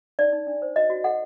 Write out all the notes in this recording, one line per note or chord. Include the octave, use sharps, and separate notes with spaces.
D#4 D5
D#4
D4
C5
F#4 D#5
F#4
A4 F#5